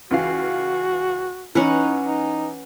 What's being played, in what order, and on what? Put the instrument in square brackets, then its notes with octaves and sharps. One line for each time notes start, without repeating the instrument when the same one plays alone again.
[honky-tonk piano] C#2 E3 F5 [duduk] F#4
[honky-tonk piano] E3 [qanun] C#4 B4 F#5 [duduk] D#4
[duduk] D#4